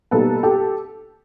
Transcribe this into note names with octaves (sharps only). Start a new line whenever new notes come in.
B2 G3 A#3 D#4 A4 B4
G4 A4